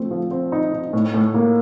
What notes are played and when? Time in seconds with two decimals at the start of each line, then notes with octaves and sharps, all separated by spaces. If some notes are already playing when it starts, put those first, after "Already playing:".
Already playing: F3 A3 C4
0.11 F3
0.31 C4
0.52 D#4
0.73 D#4
0.93 A2
1.14 A2
1.34 A#3